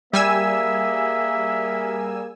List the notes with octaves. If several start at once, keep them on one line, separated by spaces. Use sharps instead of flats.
G3 A#3 G#4 A#4 E5 G#5 E6